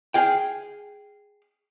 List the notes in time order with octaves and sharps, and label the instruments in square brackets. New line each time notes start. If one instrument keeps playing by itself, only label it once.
[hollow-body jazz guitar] G#4 F5 G5